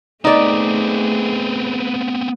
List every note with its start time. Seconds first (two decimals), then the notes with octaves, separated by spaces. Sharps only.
0.25 A3 B3 C4 D#4 G#4 D5